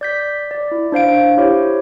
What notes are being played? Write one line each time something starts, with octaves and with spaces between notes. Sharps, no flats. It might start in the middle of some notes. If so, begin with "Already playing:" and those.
D5 G6 B6
D5
E4
D4 C5 F5 D7
E4 G4 C5 C#5